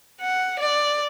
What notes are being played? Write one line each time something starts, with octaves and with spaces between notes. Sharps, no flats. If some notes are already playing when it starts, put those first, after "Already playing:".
F#5
D5